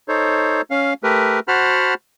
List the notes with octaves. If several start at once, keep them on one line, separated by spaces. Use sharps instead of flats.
D#4 A4 C5 C#5
C#4 F5
A3 G4 A#4 B4
F#4 C5 F#5 A5 B5 F6